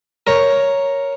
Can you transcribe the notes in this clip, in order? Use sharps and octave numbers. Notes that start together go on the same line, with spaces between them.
A#4 C#5